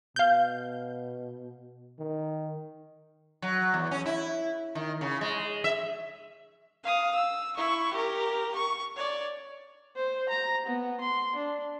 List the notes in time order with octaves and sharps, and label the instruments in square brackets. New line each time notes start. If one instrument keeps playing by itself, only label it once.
[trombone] B2 [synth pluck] F5 G6
[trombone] D#3
[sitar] F#3
E2
C#4
E4
D#3
C#3
G#3
E5
[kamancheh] F5 D#6
E6
E4 C#6
G4 A#4
C#6
C#5 D5
[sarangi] C5
A#5
B3
C6
D4